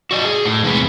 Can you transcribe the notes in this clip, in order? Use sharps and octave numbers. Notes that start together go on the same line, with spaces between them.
F#4 D5 D#5
G#4
A2
E2 C3 G#3 D#4 B4